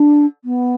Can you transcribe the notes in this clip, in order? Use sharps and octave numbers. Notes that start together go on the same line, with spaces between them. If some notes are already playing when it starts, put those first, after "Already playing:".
Already playing: D4
B3